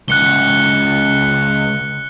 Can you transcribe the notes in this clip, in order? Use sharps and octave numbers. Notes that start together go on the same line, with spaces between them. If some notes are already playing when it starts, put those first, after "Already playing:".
C#2 F#5 F#6 C#7 G7